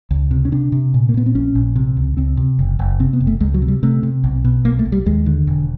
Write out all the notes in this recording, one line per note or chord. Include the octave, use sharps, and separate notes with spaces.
C#2
C3
C#4
C3 D4
C3
A#2
A#3
A#2 B3
C4
A#1 C#4
A#1
C3
C#2
C#2 C4
C3
F#1
F#1
C3 C4
B3
F#1
A3
C#2 G#3
F#3
C3
G3
C3 A3
C3
B1
B2
B1 A#3
A3
B1
G3
D#2 G#3
D3
E1